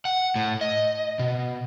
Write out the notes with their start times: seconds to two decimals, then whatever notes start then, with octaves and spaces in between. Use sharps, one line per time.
0.05 F#5
0.36 A2
0.61 D#5
1.19 B2